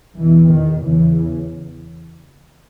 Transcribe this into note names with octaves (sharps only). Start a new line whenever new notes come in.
E2 B2 E3
D#3
E2 C#3 E3